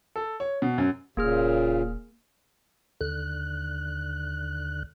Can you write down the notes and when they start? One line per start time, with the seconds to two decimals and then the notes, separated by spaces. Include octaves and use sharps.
0.16 A4
0.40 C#5
0.62 B2
0.78 F#2
1.17 D#1 A#2 C#3 A#3 G#4 F6
3.01 D#2 D3 F#6